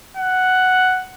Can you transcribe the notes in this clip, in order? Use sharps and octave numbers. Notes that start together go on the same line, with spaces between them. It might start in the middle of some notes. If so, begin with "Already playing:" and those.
F#5